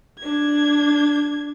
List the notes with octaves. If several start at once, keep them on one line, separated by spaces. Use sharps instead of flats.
D4 G#6